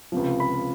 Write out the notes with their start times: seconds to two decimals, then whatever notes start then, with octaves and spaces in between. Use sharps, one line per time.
0.12 C#2 C3 F3
0.40 B5